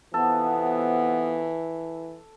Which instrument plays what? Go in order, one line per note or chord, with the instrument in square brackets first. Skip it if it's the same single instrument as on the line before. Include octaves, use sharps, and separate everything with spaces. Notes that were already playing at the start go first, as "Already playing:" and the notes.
[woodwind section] C3 F3 B3 [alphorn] E3 [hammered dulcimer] A4